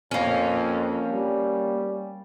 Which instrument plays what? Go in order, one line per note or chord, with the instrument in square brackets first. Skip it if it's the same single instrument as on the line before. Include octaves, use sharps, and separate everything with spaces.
[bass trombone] F2 [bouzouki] A#3 C#4
[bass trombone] G3